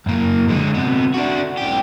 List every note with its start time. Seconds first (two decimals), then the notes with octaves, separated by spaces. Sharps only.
0.06 F#2 A#3
0.48 D3 G#3
0.74 C3 B3
1.14 D4 F#4
1.57 B1 G4